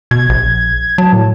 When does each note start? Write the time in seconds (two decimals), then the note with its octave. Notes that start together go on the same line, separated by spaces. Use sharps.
0.11 B2 G#6
0.29 A#1
0.98 F#3 A5
1.13 A2